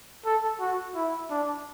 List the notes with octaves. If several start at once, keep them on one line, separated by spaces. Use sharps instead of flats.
A4
F#4
E4
D4